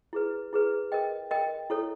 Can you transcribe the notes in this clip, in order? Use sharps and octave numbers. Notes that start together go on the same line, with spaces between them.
E4 G#4 B4
E4 G#4 B4
A#4 D#5 G5
A#4 D#5 G5
E4 A4 C#5